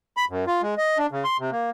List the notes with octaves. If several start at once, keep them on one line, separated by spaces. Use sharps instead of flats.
B5
F#2
F4
G#3
D#5
D4
C#3
C6
C3
A#3